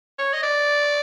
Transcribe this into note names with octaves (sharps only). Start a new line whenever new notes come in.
C#5
D#5
D5